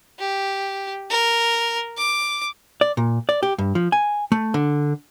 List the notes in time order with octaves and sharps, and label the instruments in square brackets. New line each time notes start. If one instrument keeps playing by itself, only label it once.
[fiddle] G4
A#4
D6
[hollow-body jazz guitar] D5
A#2
D5
G4
G2
F3
G#5
A3
D3